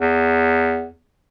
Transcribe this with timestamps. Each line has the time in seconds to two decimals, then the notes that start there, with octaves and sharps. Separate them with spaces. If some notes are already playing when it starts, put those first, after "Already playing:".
0.01 E2